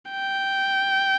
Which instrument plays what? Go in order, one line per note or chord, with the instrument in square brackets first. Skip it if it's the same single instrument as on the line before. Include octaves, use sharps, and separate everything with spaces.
[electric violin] G5